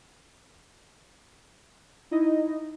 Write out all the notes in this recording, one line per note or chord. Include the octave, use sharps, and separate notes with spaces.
D#4 E4 D#5